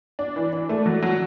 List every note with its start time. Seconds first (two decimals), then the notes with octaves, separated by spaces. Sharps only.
0.19 D4
0.36 E3
0.53 D4
0.69 A3
0.86 F#3
1.03 F#3